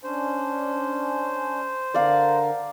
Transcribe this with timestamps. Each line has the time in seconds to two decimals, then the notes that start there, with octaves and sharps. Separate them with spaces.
0.03 C#4 D4 C5
1.94 D3 A#4 D5 F5 A#5